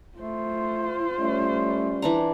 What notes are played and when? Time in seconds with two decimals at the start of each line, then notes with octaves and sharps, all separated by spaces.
0.17 A3 F4 C5
1.18 G3 A3 C#4
2.02 E3 D4 A#5